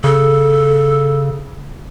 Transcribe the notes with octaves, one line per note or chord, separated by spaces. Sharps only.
C#3 A4